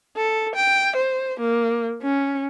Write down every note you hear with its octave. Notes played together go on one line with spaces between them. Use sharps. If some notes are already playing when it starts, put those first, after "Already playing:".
A4
G5
C5
A#3
C#4